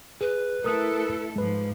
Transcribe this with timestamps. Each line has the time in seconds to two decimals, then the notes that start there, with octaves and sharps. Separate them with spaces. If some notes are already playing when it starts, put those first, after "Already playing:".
0.21 G#4 B4
0.64 A3 E4 A4 A#4 D#6 F#6
1.36 G#2 F3 G#3 B4